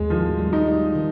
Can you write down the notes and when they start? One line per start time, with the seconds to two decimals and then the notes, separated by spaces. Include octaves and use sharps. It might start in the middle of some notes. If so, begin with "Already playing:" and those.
Already playing: D#2 G#3
0.10 D#3 F3
0.39 G3
0.53 D#4
0.67 G3
0.95 D#3